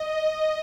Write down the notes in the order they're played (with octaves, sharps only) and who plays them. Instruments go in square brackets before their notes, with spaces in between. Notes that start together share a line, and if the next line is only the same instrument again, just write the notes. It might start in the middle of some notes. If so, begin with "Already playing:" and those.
Already playing: [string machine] D#5